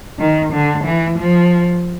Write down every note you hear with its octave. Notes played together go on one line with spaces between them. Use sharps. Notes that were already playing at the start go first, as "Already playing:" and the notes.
D#3
D3
E3
F3